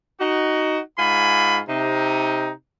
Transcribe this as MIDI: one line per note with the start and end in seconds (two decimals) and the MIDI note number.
0.21 0.80 63
0.21 0.80 66
0.98 1.60 44
0.98 1.60 65
0.98 1.60 80
0.98 1.60 83
1.69 2.51 48
1.69 2.51 63